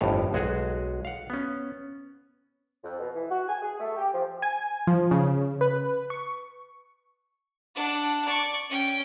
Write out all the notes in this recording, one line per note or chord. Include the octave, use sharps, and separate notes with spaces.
G1 F2 A2 F5
B1 G#3 F#4 G#4
F5 F#5
B3 C#4
F2
B2
E3
F#4
G#5
G#4
A3
G4
F3
G#5
F3
C#3
B4
C#6
D4 F#5
D5 C#6
C#4 G5